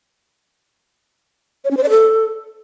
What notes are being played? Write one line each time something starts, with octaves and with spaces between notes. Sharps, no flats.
C#5
C#4
C5
D5
A4